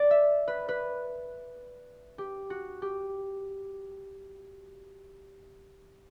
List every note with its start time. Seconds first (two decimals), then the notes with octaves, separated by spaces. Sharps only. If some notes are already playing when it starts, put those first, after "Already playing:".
Already playing: D5
0.11 E5
0.48 B4
0.69 B4
2.18 G4
2.50 F#4
2.82 G4